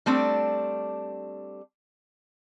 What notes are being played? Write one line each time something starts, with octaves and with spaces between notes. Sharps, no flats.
G3 A3 C4 D4